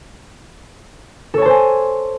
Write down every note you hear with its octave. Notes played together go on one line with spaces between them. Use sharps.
A4 C5 C#5 G#5 A5